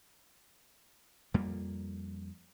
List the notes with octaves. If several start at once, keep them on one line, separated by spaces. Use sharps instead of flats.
F2 G3 A#3